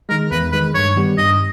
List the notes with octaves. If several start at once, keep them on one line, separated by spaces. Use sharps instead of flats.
D#3 G#3 A#4
E2 B4
D#3 G#3 B4
G2 C#5
D#3 G3 B3 G4
G2 D#5